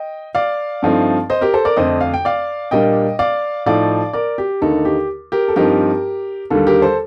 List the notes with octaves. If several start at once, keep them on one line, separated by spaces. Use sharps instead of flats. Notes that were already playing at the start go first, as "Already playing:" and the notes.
Already playing: D#5 G5
D5 F5
G2 F3 A3 C4 D#4
C5 D#5
G4 A#4
A4 C5
A#4 D5
F2 D3 A3 D4 C5 D#5
F5
G5
D5 F5
A#2 G3 A#3 D4 D#5 G5
D5 F5
A2 F3 A3 D#4 D5 F5
A#4 D5
G4
D#2 D3 A3 D#4 A4
G4
G4 A#4
A4
G2 F3 C4 D#4 G4 A#4
D#2 D3 G3 A4
G4 A#4
A4 C5